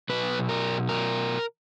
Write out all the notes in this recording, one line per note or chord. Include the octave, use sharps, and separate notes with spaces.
B2 F#3 B4
A#4
A#4